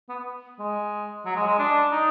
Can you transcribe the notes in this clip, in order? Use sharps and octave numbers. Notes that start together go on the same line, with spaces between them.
B3
G#3
F#3
G#3
G#3
D4
D#4